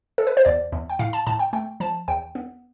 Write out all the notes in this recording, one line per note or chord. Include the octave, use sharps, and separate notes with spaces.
A4
B4
C5
E2 D5
E2
G5
A2 F5
A5
A2 A5
G5
A3 G5
F3 A5
E2 G5
B3